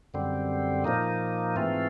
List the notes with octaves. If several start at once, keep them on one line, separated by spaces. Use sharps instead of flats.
F#2 D3 G3 C4
A#2 F3 A#3 D#4
G#2 E3 A3 C4 F4